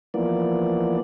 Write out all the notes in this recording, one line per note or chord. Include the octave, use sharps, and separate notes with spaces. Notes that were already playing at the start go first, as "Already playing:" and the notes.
E3 F3 A#3 B3 D5